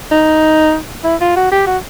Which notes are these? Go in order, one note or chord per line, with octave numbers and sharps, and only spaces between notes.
D#4
E4
F4
F#4
G4
F#4